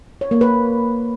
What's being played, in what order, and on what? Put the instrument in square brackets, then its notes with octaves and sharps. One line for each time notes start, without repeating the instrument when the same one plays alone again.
[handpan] C#5
A#3
B4